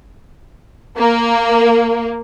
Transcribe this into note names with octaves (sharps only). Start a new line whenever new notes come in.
A#3